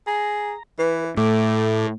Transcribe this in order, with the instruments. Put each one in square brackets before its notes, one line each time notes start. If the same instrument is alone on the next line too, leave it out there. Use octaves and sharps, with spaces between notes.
[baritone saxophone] G#4 [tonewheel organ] A#5
[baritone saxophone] E3 [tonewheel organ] B4
[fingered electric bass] A2 [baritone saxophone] A3 [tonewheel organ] A4 D6